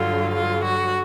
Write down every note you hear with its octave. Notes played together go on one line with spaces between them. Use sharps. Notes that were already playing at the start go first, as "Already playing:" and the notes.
Already playing: G2 D3 F#3 F4
F4
F#4